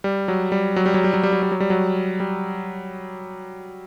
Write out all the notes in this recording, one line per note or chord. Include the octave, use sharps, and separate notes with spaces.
G3
F#3
G3
F#3
G3
F#3
G3
F#3
G3
F#3
G3
F#3
G3
F#3
G3